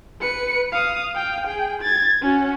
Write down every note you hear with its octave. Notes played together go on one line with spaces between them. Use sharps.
B4 C#7
F5 D#6
F5 G5
G#4 G5
G#6 A6
C#4 F#4